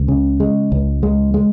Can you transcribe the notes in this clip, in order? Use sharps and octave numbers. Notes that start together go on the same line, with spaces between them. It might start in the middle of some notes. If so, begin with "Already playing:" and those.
Already playing: C#2
C#3
G#3
C#2
G#3
G#3